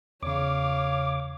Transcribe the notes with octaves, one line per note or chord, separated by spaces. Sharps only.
E2 C#3 C#5 F5 D6